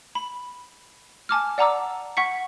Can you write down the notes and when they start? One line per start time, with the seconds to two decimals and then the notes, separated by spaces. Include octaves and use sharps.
0.15 B5
1.29 G#5 A5 D6 F6
1.58 D5 F#5 A5 A#5 D6 E6
2.17 F#5 C#6 B6 C#7